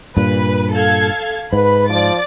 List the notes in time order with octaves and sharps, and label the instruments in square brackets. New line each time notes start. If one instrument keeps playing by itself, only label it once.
[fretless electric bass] G2 A#2 [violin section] B4
[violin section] A4 F5 G#6
[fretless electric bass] G#2 [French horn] B4 [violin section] B5
[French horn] F3 [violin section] D5 D6 A6